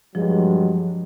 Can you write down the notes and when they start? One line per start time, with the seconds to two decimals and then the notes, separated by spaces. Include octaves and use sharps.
0.15 G2 F3 F#3 G#3